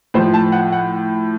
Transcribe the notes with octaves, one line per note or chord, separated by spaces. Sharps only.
A2 F3 C5
A5
F#5
F#5